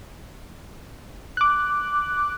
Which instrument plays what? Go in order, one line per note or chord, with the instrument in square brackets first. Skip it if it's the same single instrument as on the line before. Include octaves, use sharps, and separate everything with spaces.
[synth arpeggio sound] D6 F#6